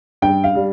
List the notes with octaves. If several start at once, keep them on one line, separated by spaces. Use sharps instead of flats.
G2 G5
F5
G3